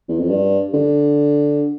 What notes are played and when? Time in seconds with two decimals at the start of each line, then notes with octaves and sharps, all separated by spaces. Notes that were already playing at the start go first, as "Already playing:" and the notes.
0.08 E2
0.19 F2
0.30 G2
0.74 D3